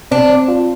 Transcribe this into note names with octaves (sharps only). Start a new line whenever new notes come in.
C4 D4
C4
F4